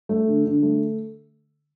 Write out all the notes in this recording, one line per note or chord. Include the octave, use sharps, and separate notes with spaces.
A3
D3
D3
A3